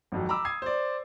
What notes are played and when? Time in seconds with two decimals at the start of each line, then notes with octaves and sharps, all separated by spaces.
0.12 G#1 F2 F#3
0.29 A#5 B5 D6 E6
0.45 D#6 G#6 C7
0.62 C5 D5